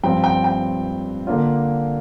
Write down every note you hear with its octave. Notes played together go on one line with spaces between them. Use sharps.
G2 F3 C4 G5
G5
G5
D3 A#3 D4 F4